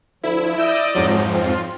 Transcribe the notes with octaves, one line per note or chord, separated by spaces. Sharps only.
D2 F3 E4
E4 D5 D#5 E6 G6 D7
F2 G#2 F3 F#3
C4 F4